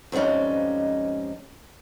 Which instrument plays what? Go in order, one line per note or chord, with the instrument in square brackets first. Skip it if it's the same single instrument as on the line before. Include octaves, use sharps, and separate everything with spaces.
[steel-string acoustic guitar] F2 G#2 G3 C#4 D#4